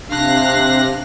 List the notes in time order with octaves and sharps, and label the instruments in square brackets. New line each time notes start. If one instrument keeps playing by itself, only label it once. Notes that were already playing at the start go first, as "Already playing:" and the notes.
[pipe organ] C3 A#6 [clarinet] D4 [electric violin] F5 F#6
[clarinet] D4